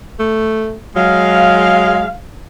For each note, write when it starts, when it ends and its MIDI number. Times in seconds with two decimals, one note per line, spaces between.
0.19 0.76 57
0.96 2.08 54
0.96 2.13 56
0.96 2.13 77